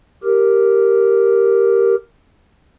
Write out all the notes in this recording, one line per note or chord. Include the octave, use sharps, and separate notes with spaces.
G4 A#4